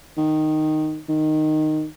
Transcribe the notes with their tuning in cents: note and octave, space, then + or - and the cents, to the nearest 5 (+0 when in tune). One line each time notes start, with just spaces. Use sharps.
D#3 -5
D#3 -10